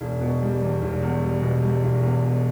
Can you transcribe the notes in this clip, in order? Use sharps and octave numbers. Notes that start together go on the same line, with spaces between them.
E1
B2
G3
E2
E1
E2
G3
B2
G3
E1
E2
B2